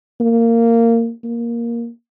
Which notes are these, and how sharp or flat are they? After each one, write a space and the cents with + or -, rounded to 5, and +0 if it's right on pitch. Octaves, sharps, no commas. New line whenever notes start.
A#3 -20
A#3 +10